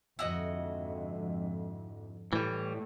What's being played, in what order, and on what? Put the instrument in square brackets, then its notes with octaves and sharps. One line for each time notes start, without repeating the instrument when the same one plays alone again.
[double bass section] F2 G#2 D3 [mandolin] E4 F#4 D#5
[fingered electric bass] A2 [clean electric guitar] E3 G3